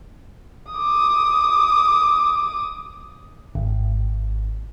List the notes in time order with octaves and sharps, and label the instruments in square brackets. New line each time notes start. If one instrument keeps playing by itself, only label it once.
[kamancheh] D6 D#6
[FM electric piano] G#1